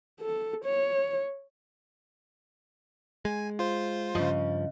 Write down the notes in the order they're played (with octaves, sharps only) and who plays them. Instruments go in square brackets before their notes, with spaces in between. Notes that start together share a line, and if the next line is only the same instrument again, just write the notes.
[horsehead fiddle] A4
C#5
[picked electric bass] G#3 [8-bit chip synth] G#5
[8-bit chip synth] F4 C5
[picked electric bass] G2 F3 [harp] C#3 D#5